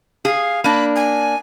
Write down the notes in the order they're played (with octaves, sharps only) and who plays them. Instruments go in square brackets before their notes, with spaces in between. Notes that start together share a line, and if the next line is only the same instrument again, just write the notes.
[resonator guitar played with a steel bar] G#4 [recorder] F5
[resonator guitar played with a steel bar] A#3 D4 [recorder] B5
[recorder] G#5